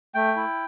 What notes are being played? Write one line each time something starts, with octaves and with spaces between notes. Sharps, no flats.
A3 G5
E4